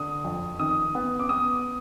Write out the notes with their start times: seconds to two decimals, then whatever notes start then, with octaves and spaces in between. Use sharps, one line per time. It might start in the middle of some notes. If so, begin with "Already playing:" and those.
Already playing: D3 D#6
0.25 F2
0.59 D#3 D#6
0.95 B3
1.19 D6
1.29 B3 D#6